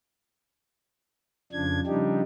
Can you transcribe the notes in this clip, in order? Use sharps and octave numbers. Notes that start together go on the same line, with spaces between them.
F2 C#3 F3 D4 G#6
C#3 F3 G3 D4 D#4 G4